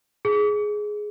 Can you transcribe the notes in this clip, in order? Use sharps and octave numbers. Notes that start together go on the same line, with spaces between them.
G#4